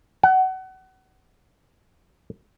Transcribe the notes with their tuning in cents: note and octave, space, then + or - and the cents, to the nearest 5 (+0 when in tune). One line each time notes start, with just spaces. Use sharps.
F#5 +30